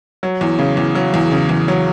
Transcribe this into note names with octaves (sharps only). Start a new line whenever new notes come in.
F#3
E2
C#3
E2
F#3
E2
C#3
E2
F#3